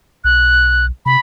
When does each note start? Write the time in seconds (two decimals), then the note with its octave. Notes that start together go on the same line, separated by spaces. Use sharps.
0.24 B1 F#6
1.06 C3 B5